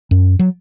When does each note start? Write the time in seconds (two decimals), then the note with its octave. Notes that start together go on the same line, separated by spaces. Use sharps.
0.11 F#2
0.39 F#3